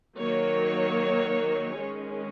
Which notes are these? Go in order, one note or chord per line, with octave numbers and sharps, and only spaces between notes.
D#3 F#3 A#3 C#5
D#3 G#3 C#4